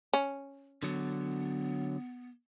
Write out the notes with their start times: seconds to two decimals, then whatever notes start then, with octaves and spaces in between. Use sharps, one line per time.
0.13 C#4
0.83 D3 F#3 B3